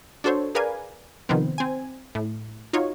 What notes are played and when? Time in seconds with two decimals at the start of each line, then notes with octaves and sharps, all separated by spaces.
0.24 D4 F#4 A4 C5 C#5
0.55 G#4 A#4 B4 D5 F5 G#5
1.29 C3 D#3 F3 B3 C4
1.58 C4 G#5
2.15 A2
2.73 D#4 F4 F#4 C#5